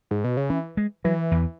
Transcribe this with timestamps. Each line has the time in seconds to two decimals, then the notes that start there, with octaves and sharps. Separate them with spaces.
0.11 G#2
0.24 B2
0.37 C#3
0.50 E3 C#4
0.77 G#3
1.04 E3 F#3
1.32 E2